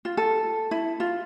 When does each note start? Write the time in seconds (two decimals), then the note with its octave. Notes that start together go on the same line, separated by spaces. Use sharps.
0.05 F4
0.17 A4
0.71 E4
1.00 F4